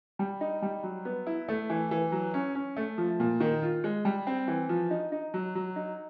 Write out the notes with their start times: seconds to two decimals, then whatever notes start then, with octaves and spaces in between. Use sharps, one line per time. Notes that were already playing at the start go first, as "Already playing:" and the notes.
0.19 G3
0.41 D#4
0.62 G3
0.83 F#3
1.05 B3
1.27 E4
1.48 A3
1.70 E3
1.91 E3
2.12 F#3
2.34 C#4
2.55 C#4
2.77 A3
2.98 F3
3.20 A#2
3.40 D#3
3.62 F4
3.84 G#3
4.05 G3
4.27 C4
4.48 E3
4.69 F3
4.91 D#4
5.12 D#4
5.34 F#3
5.55 F#3
5.76 D#4